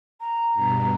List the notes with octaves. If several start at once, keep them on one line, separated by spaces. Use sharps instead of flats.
A#5
G2 B2